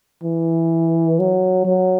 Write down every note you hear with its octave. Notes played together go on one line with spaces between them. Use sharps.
E3
F#3
F#3